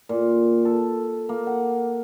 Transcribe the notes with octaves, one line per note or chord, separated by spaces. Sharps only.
A#2
A4
A#3
F#5